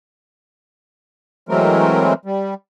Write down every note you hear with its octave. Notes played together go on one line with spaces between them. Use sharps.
E3 F#3 G#3 A3 C4 A#4
G3